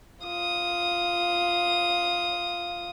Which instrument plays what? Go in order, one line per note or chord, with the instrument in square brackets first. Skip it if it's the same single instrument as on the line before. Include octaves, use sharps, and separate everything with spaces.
[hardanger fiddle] F4 D#6